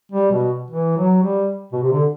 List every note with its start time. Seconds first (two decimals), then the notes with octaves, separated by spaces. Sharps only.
0.12 G3
0.32 B2
0.71 E3
0.97 F#3
1.23 G3
1.73 B2
1.83 C3
1.92 D3